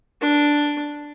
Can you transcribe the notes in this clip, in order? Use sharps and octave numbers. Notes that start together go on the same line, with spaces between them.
D4